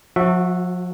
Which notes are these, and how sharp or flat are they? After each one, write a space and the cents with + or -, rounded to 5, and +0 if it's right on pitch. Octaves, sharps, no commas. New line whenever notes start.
F3 +40 F#4 -10 E5 +0